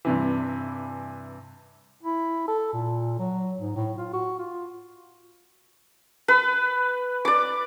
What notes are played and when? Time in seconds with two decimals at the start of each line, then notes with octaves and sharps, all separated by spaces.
0.05 G2 C3 E3
2.03 E4
2.48 A4
2.73 A#2
3.19 F#3
3.60 G#2
3.76 A2
3.98 F4
4.13 F#4
4.38 F4
6.28 B4
7.25 D5 D6